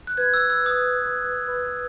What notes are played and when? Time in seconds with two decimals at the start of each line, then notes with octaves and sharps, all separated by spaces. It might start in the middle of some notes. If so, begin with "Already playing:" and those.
0.07 F#6
0.17 B4 G#6
0.34 E6
0.50 E6
0.66 D#6
1.47 B4